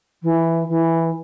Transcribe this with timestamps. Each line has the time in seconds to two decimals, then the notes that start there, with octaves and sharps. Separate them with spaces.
0.22 E3
0.68 E3